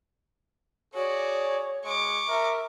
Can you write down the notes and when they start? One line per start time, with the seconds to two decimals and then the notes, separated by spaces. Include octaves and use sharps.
0.94 F#4 G#4 C#5 D5
1.84 G#3 C#6 D6
2.28 A#4 E5